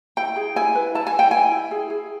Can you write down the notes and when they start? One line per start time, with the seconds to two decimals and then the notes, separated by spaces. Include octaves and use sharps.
0.17 E4 G5
0.36 G#4
0.56 E4 G#5
0.75 B4
0.95 E4 A5
1.07 G#5
1.14 E4
1.19 G5
1.31 E4 G#5
1.52 E4
1.71 G#4
1.90 G#4